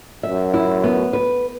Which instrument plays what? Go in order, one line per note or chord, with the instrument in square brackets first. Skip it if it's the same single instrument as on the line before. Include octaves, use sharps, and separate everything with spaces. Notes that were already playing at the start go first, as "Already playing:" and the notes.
[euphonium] F#2 [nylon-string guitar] E5
[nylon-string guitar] E4
B3
B4